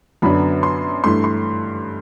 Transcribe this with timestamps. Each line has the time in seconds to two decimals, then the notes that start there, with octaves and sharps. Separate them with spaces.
0.22 F#2 D3 F#3 B3 D4 B5
0.63 C6
1.04 G2 E3 A3 C6
1.24 C6